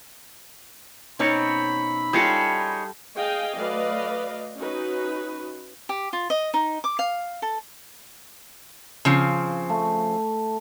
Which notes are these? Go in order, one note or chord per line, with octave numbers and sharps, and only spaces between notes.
B2 C4 C#4 D#4 C#5 D5 B5
G3 D#4 F4 G#4 A4 C#5
G#4 D#5 F5 G5 G#5
F#3 A3 B4 D5 D#5 F5
C#4 D#4 F#4 B4
G4
F4
D#5
D#4
D6
F5
A4
C#3 F3 C4
A3